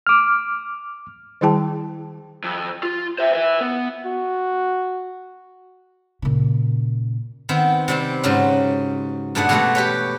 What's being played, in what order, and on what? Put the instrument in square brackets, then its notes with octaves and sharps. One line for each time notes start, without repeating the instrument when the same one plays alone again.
[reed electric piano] D6 F6
[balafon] D#3 G3 E4 G#4 G5 A5
[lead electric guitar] F2
F4
C5 E5
B4 E5
B3
[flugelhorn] F#4
[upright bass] A#2 C#3
[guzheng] D#3 B3 C4
C3 G3 C4
G#2 C#3 F#3
G2 A#2 A3 D4 G#4 F#5
B2 E3 G#3 A3 E4 F#4
G4 B4 C#5